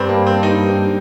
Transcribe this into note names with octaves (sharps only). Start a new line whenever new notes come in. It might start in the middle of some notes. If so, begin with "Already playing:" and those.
Already playing: G2 C4
A#3
C4
D#4